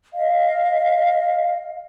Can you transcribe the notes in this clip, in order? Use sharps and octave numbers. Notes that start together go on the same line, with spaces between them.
D#5 F5